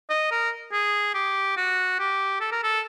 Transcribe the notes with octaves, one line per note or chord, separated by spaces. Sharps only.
D#5
A#4
G#4
G4
F#4
G4
A4
A#4
A4